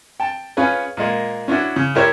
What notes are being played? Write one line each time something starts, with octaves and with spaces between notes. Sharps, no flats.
G5 A5
C#4 F4 G#4 B4 C#5
A#2 G#3 A#3
C#4 D4 E4 F#4
C#3
E4 G4 A#4 C5 C#5 E5